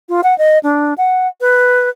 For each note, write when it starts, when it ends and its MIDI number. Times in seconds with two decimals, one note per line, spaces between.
0.09 0.21 65
0.24 0.37 78
0.38 0.59 75
0.63 0.94 62
0.98 1.28 78
1.41 1.89 71